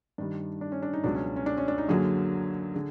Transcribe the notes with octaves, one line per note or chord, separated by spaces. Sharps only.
G2 D#3 G3 D4
D4
C#4
D4
D#4
C#2 B2 F#3 D4
C#4
C#4
D4
C#4
D4
D#4
F#2 D3 F#3 A#3 G#4
D3 G#4